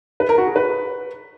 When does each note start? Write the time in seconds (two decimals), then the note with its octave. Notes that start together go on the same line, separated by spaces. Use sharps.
0.20 B4
0.29 A#4
0.38 F#4
0.47 G#4
0.56 B4